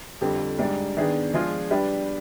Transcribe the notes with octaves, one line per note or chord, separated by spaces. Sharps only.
F2 D3 G3 C4 G4
G#2 G3 D4
D#3 B3 D4 G#4
F3 G#3 D4 F4 G#4
G3 D4 G4 B4